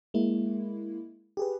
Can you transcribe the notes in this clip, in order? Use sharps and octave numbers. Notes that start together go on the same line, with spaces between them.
G#3 A#3 E4
G4 G#4 B4